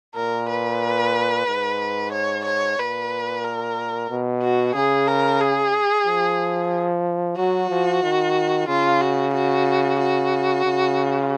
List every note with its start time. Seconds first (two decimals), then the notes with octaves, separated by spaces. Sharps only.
0.15 A#2 A#4
0.49 B4
1.47 G#2
2.13 C#5
2.45 C#5
2.78 A#2 B4
3.44 A#4
4.10 B2
4.42 F#4
4.75 C#3 G#4
5.08 A#4
5.41 G#4
6.06 F3
7.37 F#3 F#4
7.70 F3
8.03 D#3
8.68 C#3 F4
9.01 F#4
9.34 F#4
9.99 F#4
10.65 C#3